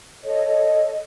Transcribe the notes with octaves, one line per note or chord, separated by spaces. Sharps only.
A4 C#5 D#5